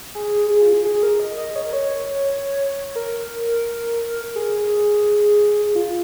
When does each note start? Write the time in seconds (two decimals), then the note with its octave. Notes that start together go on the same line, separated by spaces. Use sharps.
0.15 G#4
0.51 G#4
0.62 F4
0.73 G#4
0.85 G#4
1.03 A#4
1.20 D#5
1.37 D#5
1.56 C#5
1.64 A#4
1.73 C#5
2.96 A#4
4.35 G#4
5.75 F4